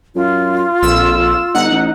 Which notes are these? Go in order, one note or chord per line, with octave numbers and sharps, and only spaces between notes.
F#2 F4
A#1 F2 E6
G1 D#4 F#5
A1